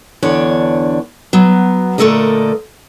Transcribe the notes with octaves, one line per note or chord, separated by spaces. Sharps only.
E2 D3 D4 C#5
F#3 B3
A#2 D3 A3 A4 A#4 D#5